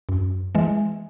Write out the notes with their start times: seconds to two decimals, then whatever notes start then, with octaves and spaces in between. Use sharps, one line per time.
0.09 F#2
0.55 E3 G#3